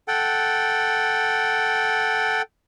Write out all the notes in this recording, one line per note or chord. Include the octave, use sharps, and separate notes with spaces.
A4 F#5 G5